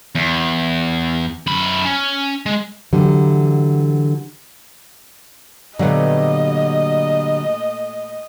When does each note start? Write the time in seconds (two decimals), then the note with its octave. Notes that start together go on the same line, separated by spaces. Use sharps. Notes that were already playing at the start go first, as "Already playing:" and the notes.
0.15 E2
1.47 F#2 B5
1.85 C#4
2.46 G#3
2.93 D3 E3 F#3 G3
5.79 A#2 D3 F#3 G3 A3 B3 D#5